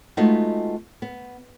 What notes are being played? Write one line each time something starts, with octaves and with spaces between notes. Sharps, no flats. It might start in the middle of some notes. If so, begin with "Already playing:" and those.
G#3 A3 B3 D#4 F4 F#4
B3